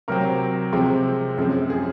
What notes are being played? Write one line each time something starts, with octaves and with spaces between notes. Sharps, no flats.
C3 F#3 C4 A#4
C3 F3 G#3 C4
F#2 F3 G#3 C4
G#4